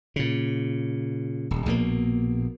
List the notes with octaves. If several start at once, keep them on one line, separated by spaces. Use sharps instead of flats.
A#2 C#3
D#1
A#1 B2 A#3